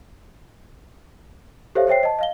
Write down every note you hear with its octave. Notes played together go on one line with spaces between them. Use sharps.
G4 A4 C5 C#5 E5 F5
C5 C#5 E5 G5 C7
D#5 A5
D#5 F5 G7